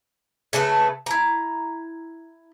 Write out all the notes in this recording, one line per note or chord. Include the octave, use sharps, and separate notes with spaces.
C#3 A3 A4 B4
E4 A#5